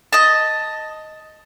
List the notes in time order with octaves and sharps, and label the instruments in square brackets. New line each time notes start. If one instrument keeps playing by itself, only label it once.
[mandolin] D#5 A5